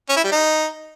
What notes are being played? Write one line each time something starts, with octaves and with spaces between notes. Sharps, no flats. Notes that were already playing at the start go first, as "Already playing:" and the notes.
C#4
E4
G3
D#4